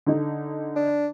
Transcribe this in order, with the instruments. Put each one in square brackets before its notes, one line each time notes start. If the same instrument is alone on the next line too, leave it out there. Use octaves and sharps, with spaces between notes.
[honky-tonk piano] D3 D#4
[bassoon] D4